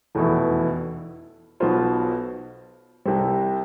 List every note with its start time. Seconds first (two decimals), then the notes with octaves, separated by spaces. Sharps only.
0.15 F1 E2 B2 B3 E4
1.60 B1 B2 B3 F4 C5
3.06 C2 C3 G3 C4